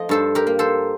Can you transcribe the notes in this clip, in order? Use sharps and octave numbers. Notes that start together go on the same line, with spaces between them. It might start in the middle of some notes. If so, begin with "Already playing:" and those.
Already playing: F3 A3 D#5
G2 A4 C5
G4 A#4
A#3
A4 C5